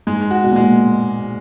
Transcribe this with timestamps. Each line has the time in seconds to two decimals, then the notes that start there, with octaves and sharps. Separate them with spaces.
0.07 G#2 G#3
0.31 F#4
0.44 B2
0.52 A#2 G#3